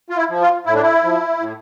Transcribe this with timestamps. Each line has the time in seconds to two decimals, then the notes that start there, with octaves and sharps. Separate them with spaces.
0.10 F4
0.17 E4
0.30 F3
0.42 F4
0.66 A2 E4
0.74 D4
0.82 E4
1.04 F3
1.40 A2